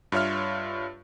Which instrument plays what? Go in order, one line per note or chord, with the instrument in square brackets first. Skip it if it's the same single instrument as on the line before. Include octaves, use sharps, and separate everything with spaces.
[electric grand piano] G2 F4 C#5 E5 F6